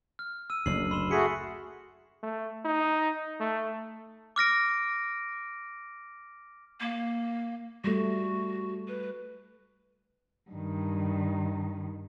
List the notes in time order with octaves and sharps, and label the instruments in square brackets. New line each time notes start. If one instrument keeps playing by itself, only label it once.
[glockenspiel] F6
E6 D#7
[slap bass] F#1 D2 [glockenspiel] C7 F#7
[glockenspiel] B5 C6 E7
[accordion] A3 F#4 G#4 [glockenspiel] B6 C#7
[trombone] A3
D#4
A3
[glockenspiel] D6 F6 A#6 D7
[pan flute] A#3
[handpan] G3 A3 [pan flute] F#4
[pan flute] B4
[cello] G2 D#3